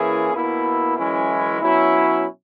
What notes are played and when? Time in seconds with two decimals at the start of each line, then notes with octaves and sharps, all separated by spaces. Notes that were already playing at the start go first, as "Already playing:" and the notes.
Already playing: E3 A#3 C#4 E4 G#4
0.33 B2 A#3 E4
0.97 F#2 E3 G#3 C#4 E4
1.62 B2 F#3 C#4 E4